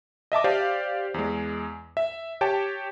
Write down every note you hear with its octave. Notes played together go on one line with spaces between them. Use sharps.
D#5 E5 A5 D6
G4 C5 D5 F5
E2 G#3
E5
G4 C#5 G5 A5